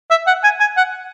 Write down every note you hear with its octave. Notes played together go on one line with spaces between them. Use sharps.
E5
F#5
G#5
G#5
F#5